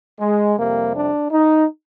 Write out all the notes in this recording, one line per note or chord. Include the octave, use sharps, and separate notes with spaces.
G#3
F2 C3 G3 A#3
D4
D#4